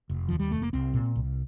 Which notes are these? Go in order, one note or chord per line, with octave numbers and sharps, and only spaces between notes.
F1
D#2 F3
G3
F1 A3
A#3
C2 C4
A#2
C2